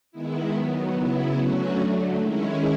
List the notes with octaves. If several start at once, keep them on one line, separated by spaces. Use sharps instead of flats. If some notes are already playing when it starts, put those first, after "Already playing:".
D#3 G#3 B3 E4
D#3 F#3 B3
C#3 F#3 B3 E4
D3 F#3 A3 C#4 F#4
D3 F#3 A3
D#3 G#3 C#4 E4